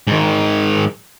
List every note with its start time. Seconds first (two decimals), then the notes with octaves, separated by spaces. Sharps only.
0.07 G#2 D#3